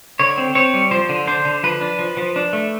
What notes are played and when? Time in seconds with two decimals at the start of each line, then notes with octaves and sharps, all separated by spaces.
0.19 D3 C#5
0.38 C4
0.55 C4 C#5
0.74 G3
0.91 F3 C5
1.09 D3
1.28 D4 C5
1.45 D3
1.63 F3 B4
1.81 D4
1.99 F3
2.17 F3
2.36 D4
2.53 A3